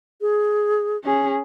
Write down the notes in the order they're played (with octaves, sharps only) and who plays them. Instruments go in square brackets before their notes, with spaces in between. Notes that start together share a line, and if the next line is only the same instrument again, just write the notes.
[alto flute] G#4
[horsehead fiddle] C#4 G#4